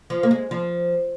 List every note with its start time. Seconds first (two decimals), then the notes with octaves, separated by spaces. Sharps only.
0.10 F3
0.23 A#3
0.31 G#3
0.51 F3